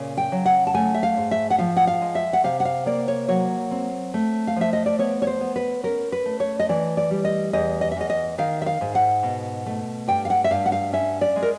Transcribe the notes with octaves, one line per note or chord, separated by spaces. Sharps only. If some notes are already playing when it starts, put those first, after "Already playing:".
Already playing: A#2 C#3
G5
F#3
F#5
A5
A3 G#5
E5
F5
G#2
E5
F#5
F3 F5
F#5
F5
G#3
E5
F#5
C3 F5
F#5
F5
A#3 D5
C#5
F#3 C#5
C4
A3
F5
F3 E5
D#5
D5
B3 C#5
C#5
C5
B3
B4
C#4 A#4
B4
A3
C#5
D#5
E3 D5
D5
G3
D#5
E2 D#5
D#5
E5
E2 D#5
D#5
D#3 F5
E5
F5
G#2
F#5
B2
A3
G2 G5
F5
F#5
E5
G2 F5
F#5
F5
C#4 E5
D5
G#3
A#4